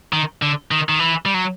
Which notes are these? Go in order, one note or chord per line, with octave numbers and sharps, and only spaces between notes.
D#3
D3
D#3
D#3
E3
G3
F#3